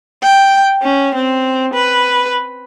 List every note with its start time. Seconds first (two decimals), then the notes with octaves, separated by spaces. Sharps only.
0.23 G5
0.82 C#4
1.15 C4
1.74 B4